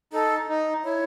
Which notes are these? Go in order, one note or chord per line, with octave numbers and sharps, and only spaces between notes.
D#4 A4
D#4
E4 C#5